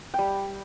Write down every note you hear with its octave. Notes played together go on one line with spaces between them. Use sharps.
G3 G5